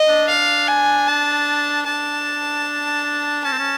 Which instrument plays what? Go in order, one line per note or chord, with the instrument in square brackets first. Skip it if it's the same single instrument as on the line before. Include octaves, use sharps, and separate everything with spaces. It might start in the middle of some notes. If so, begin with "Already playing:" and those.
Already playing: [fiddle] D#5
[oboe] D4
[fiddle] F5
G#5
A5
[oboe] D4 [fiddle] A5
[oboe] C#4 [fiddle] A5
[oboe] C4
C#4